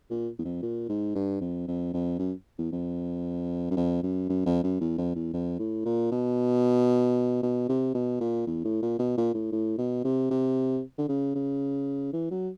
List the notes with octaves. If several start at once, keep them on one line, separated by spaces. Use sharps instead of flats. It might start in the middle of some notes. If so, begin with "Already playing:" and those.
A#2
E2
F2
A#2
G#2
G2
F2
F2
F2
F#2
E2
F2
F#2
F2
F#2
F#2
F2
F#2
E2
F2
E2
F2
A2
A#2
B2
B2
C3
B2
A#2
E2
A2
A#2
B2
A#2
A2
A2
B2
C3
C3
D3
C#3
C#3
E3
F#3